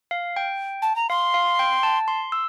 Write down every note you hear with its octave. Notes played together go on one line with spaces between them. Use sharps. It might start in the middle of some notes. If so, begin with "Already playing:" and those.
F5
G5
A5
A#5
F5 C6
F5
G5
A5
C6
E6